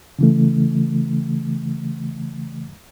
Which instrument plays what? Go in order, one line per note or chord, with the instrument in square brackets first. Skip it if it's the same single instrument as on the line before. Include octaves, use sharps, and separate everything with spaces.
[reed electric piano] C#3 E3 A3